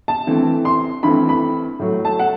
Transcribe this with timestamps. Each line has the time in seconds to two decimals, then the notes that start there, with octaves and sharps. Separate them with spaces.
0.08 A5
0.27 G2 E3 A3 C4
0.65 C6
1.03 G2 E3 A3 C4 B5
1.29 B5
1.79 A2 F#3 A3
2.05 A5
2.19 F#5